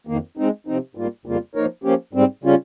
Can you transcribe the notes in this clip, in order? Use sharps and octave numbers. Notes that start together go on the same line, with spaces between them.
F2 D#3 A#3
G#3 C4 D#4
C3 F3 C4 D#4
G#2 G3 A#3 F4
F2 C#3 G3 A#3 F4
F3 A#3 D#4 A#4 C#5
F3 A#3 C#4 G4
G#2 G3 C4
C#3 G3 C#4 F4